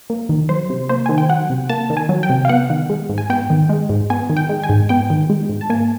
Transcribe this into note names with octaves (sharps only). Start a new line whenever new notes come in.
A#3
D#3
F#3 C5
C3
A#3 C5
D#3 G#5
G5
F#3 F#5
C3
A#3 A5
D#3
G#5
F#3
G5
C3
F5
B3 F#5
D#3
G#3
G#2
G#5
B3 G5
D#3
G#3
G#2
B3 G#5
D#3
G5
G#3
G#5
G#2
B3 G5
D#3
G#3
G#2
A5
A#3 G#5